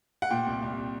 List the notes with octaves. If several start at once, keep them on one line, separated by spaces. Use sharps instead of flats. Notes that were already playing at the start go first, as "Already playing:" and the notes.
F#5
A#2 G5
C2
C2